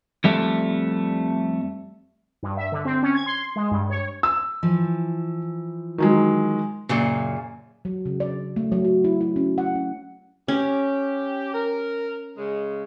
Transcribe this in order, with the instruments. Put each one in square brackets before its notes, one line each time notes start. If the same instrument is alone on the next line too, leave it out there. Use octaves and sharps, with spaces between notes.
[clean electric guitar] F2 G3 A3
[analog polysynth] G2
E5
D3
C4
C#4
G#6
C6
G#3
G2
C#5
[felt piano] E6
[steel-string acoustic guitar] E3 F3
[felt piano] D#3 F#3 G#3
[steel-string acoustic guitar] F#2 A#2 C#3
[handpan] F#3
C#3
D5
A3
F#3
F#4
E4
E4
C#4
F#5
C#4
[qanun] C#4 [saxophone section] G4
[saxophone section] A#4
C#3 G#3